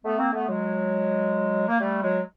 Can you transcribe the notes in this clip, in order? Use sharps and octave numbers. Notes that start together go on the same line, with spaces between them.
A3 B3
A#3 C4
A3 B3
F#3 G#3
A#3
G3 A3
F#3 G#3